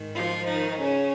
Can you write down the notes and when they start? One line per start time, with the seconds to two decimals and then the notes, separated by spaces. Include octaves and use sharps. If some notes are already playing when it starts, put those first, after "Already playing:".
Already playing: G#2 D#3
0.15 F3 F4
0.48 D#3 D#4
0.81 C#3 C#4